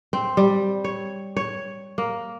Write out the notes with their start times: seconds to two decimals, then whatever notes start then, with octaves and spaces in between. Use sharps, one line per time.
0.13 C4
0.37 G3
0.84 C#5
1.37 C#5
1.98 A#3